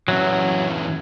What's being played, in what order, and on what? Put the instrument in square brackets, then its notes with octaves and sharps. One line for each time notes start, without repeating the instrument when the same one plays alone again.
[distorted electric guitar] F#2 E3 [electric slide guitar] F#3